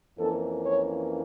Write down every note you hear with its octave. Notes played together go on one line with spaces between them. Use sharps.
F2 E3 A#3 C#4 A4
C#5